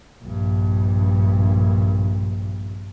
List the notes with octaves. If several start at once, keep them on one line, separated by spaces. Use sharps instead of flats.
A#1 G2